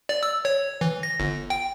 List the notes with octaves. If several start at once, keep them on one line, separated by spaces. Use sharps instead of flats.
D5
E6
C#5
E3
A#6
G1
G5